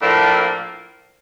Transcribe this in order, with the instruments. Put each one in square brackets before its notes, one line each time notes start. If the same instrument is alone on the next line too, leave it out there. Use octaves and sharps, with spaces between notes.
[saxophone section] A2 F3 A#3 D4